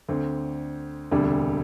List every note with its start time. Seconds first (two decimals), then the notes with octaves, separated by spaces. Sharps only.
0.08 D2 D3 C4
1.11 E1 D2 C3 G3 D4